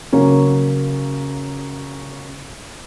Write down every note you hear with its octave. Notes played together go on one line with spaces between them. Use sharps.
C#3 F#3 A#3 C#4